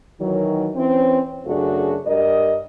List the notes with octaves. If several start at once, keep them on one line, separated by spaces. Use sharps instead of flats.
D#3 E3 F#3
E3 C4 C#4
F#2 C#3 A3 D4 F#4 G#4
G2 G3 A#4 D5 D#5